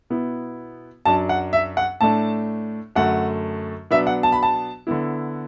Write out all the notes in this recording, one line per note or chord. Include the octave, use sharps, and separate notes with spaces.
B2 B3 E4
F#2 F#3 D4 A5
F#5
E5
F#5
A2 A3 D4 A5
F#2 D3 A3 F#5
B2 F#3 B3 D4 E5
F#5
A5
B5
A5
D3 B3 E4